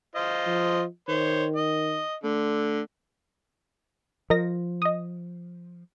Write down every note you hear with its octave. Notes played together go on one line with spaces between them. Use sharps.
F4 C5 D#5
F3
D#3 C5 C#5
D#5
D3 A3
F3 A#4 D#5 A#6
D#5 D#6